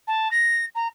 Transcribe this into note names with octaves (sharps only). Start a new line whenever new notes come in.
A5
A#6
A#5